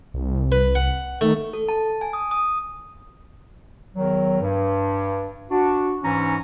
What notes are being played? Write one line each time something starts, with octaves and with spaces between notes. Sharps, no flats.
C2
B4
F#5
D#3 A3
A4
A5
G#5
D#6
D#6
E2 D#3 F#3
G2
D4 F#4
G#2 E3 C#4 D#4 A#5